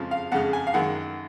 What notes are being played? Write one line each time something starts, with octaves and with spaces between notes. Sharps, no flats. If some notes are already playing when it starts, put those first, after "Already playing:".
Already playing: F2 C#3 F3 G#3
F5
F2 C#3 G#3 F#5
G#5
F5
F#2 D#3 G#3 F#5